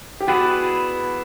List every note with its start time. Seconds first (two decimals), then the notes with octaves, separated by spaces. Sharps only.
0.20 G4
0.27 B3 E4 F#4 G#4 B4 D5